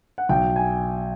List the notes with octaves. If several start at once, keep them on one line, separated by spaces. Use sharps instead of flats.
F#5
B1 G5
G#5